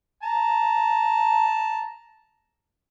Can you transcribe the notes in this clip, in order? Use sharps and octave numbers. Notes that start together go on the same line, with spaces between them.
A5 A#5